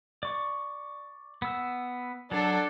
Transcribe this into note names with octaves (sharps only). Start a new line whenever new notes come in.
D5 C#6
B3 E6
F#3 D4 A4